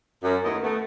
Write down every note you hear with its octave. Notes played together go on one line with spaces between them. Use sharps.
F#2
D#2 F#3 A3 B3 E4 D#5
A3 B3